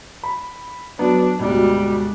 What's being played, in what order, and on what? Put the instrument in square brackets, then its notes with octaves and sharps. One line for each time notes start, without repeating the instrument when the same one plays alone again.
[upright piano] B5
[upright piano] F#3 B3 [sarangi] D4
[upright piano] D2 G#2 B2 [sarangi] G3